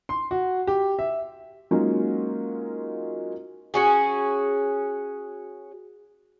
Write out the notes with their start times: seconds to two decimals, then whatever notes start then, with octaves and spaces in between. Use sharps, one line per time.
0.09 C6
0.31 F#4
0.67 G4
0.99 E5
1.71 F#3 G#3 A#3 C#4 D#4 F4
3.74 C#4 F#4 G#4